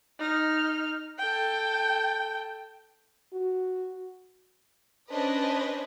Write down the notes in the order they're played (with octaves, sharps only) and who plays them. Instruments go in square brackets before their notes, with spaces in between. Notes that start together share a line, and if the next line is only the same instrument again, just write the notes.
[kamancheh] D#4 F6
A4 G5
[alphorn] F#4
[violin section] C#4 D4 B4 C5 D#5